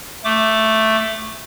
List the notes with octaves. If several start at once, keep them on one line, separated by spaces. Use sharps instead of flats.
A3 D6